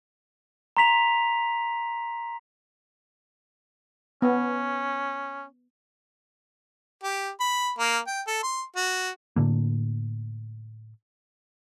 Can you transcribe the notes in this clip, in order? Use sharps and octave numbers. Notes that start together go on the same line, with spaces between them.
A#5 C6 B6 F7
B3 C#4
G4
B5
A#3
G5
A4
C6
F#4
A2 D3 A#3